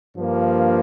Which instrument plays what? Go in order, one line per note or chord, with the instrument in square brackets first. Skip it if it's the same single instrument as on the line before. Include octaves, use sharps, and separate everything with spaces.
[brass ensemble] G2 F3 A#3